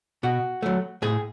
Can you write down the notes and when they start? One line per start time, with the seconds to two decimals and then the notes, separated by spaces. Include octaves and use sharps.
0.23 B2 F#4
0.63 F#3 A3
1.02 A2 G#4